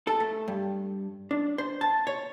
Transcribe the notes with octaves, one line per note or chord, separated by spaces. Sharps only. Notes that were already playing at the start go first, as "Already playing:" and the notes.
A4
A3
G2
D4
C5
A5
C#5